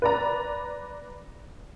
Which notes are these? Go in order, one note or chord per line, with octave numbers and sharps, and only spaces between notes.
B4 D5 A#5